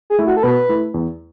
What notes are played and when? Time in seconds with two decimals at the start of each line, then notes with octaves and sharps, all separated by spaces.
0.10 G#4
0.19 A3 E4
0.26 F#4
0.37 A4
0.43 B2 B4
0.69 A3 E4
0.94 E2